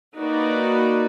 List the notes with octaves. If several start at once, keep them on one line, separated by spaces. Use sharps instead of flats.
A#3 D#4 F#4 B4 D5